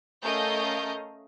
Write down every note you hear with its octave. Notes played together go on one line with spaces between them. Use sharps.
A3 C#4 A#4 D#5 F5 G6